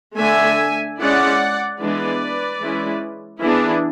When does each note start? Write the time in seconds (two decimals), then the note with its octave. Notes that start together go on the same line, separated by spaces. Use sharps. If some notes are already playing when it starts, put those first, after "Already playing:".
0.17 D3 A3 D4 E5 G#5
0.99 G#3 C#4 E4 D5 F#5
1.80 E3 G#3 B3 D4 B4 D5
2.61 E3 G#3 C#4 E4
3.41 E3 B3 D4 E4 G#4